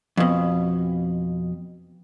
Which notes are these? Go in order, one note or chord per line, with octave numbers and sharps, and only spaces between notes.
F2 B2